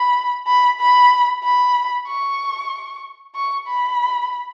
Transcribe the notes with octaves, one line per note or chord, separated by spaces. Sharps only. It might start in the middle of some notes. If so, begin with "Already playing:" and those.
Already playing: B5
B5
B5
B5
C#6
C#6
B5